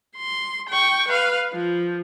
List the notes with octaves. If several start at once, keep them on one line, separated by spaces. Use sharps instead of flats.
C6
G5 C#6
B4 F5
F3